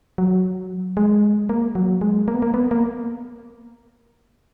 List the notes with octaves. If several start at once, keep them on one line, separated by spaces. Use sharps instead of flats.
F#3
G#3
A#3
F#3
G#3
A#3
B3
A#3
B3
A#3